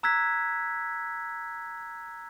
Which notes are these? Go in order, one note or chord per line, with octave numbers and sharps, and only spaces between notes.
A#5 E6 F#6 G#6 B6